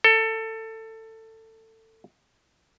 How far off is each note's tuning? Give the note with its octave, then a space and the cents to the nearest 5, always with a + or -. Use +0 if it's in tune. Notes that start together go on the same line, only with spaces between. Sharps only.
A4 +20